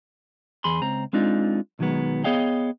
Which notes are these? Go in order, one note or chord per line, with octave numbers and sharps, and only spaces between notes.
E2 G#4 B5 C6
C#2 C4 A#5
G#3 C4 D4 D#4 F4
B1 D#3 F#3 G#3 B3
B3 G#4 C#5 D#5 F5 G5